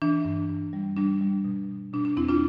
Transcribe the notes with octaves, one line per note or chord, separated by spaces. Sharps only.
E3 D4
G2
G2
G3
G3 D4
G3
B2
B2
B2 D4
D4
E2 C4 E4
D4 F4